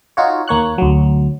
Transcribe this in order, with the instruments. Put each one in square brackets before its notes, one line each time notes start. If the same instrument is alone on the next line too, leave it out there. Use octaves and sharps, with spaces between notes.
[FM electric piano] D#4 F4 F#4 C#5
D#2 A#3 C#5 F#6
D2 F#3